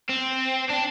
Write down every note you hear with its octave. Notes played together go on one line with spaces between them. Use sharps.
C4
D4